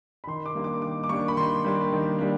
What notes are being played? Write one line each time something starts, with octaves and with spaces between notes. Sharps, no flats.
B5
D#3 C6
D6
G3 A#3 D4
D6
D#3 D6
D6
G3 A#3 D4 C#6
B5
D#3 C6
G3 A#3 D4
D#3
G3 A#3 D4